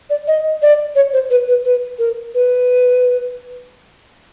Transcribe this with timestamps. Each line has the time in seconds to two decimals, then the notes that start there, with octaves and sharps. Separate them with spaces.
0.10 D5
0.27 D#5
0.62 D5
0.95 C#5
1.13 C5
1.30 B4
1.48 B4
1.65 B4
1.99 A#4
2.34 B4